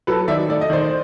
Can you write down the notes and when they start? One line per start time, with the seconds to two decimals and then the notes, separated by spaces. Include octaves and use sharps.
0.07 F#3 A4 B4
0.28 D#3 D5 E5
0.49 A3 D5
0.61 D#5
0.70 D#3 C5 D5